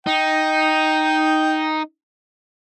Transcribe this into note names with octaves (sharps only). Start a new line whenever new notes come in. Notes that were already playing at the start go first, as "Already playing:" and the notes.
D#4 G5